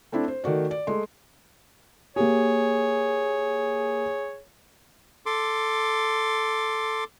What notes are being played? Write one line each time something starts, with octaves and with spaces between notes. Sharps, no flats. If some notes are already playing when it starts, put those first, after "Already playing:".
A3 C4 D4 E4
C5
D#3 A3 F#4 D5
D5
G#3 A3 C6
A#3 G4 G#4 C#5
A4 C6 D6